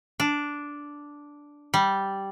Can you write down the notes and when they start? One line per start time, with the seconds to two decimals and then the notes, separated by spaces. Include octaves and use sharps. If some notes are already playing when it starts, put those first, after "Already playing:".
0.20 D4
1.74 G3